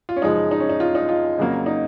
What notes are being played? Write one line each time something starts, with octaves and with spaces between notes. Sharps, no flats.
F4
C#4
F#2 C#3 F3 G#3 D#4
D#4
C#4
D#4
F4
D#4
F4
F2 C#3 F#3 A#3
D#4